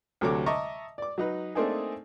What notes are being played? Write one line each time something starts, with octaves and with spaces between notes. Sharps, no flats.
D2 C3 F#3 A4 C#5 D6
D#5 E5 A5 A#5 C#6 D6
D5 D6
F#3 D#4 B4
A3 A#3 C4 D4 D#4 G#4